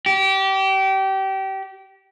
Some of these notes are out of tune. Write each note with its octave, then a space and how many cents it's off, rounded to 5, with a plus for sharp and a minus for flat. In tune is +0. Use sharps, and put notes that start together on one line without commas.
G4 -25